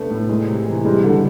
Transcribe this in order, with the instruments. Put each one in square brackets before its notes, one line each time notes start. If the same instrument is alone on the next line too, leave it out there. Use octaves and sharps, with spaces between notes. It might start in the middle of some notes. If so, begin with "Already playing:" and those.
Already playing: [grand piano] C3 B3 D4 [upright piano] A3
[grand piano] A2
G#3
C3
E3
[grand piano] G3 [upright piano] G#3
[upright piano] D3 [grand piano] G3